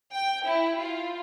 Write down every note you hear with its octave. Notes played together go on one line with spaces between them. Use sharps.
G5
E4
F4